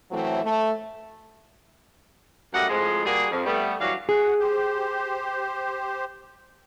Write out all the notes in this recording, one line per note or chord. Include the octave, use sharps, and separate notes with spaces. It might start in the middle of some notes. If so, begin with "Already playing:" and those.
A2 E3 F#3 A3 C4
A3
F#2 G3 A3 D5 D#5 F#5
F2 A2 F3 G#3
G3 A#3 F#4 G#4
F2
G3 A3 B3
E3 F#3 G3 D4 F#4 F5
F#4 G#4 F#5
G4 C5